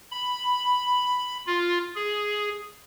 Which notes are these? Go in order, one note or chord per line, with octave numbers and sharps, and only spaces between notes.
B5
F4
G#4